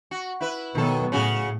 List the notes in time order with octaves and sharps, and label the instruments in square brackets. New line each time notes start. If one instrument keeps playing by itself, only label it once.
[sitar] F#4
E4 B4
[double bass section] B2 F#3 B3 [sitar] D#3 A4
[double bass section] A2 [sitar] C#3 F#4 G#4